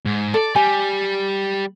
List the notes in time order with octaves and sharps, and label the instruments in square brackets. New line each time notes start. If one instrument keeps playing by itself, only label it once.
[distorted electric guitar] G#2
[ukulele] A4 [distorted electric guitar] D5
[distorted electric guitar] G3 [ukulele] G#5